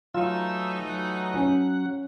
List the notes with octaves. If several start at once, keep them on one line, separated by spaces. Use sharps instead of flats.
E3 F#3 A3 D#4 F4 E6
F#3 F#5
C#4